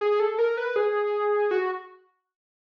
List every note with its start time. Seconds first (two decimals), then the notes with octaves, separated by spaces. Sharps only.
0.01 G#4
0.20 A4
0.39 A#4
0.57 B4
0.76 G#4
1.51 F#4